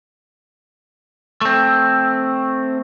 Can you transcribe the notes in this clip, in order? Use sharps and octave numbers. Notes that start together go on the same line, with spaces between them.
A3 C4